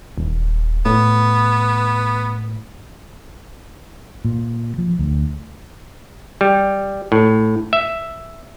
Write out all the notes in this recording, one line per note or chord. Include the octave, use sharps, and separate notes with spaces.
D#1
A2 B3
A#2
F3
D2
G3
A2
E5